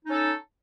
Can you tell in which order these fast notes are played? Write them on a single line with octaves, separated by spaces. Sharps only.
D#4 C#4 A4